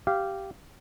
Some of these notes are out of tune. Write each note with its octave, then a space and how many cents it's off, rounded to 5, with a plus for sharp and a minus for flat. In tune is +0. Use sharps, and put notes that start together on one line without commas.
G4 -10 F5 -15